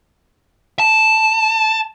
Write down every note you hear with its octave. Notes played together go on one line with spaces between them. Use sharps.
A5